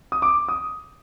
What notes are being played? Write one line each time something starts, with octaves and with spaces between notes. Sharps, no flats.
D#6
D6
D#6